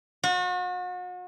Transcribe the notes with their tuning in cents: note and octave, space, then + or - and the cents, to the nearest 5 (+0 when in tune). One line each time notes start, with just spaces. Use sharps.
F#4 -40